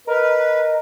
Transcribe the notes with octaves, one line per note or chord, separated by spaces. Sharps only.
A#4 B4 D#5